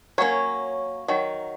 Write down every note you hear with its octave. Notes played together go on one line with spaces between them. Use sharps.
F#3 A#3 C#4 C#5
D#3 F#3